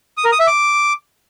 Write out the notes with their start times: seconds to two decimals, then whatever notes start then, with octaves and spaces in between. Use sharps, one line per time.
0.17 D#6
0.25 A#4
0.32 D#6
0.40 E5
0.47 D6